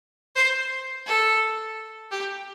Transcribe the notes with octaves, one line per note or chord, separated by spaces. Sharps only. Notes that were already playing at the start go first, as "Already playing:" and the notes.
C5
A4
G4